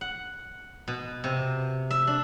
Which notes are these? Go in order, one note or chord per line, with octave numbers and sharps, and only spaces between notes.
F#5
B2
C3
E5
D4